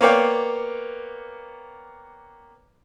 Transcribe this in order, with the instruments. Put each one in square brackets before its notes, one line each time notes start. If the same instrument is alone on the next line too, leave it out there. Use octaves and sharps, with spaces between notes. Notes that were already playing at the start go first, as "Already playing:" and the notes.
[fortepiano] A#3 B3 C#5 D5 F5 G5